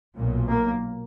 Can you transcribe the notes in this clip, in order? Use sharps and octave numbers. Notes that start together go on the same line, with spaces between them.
B1 A#2
A#3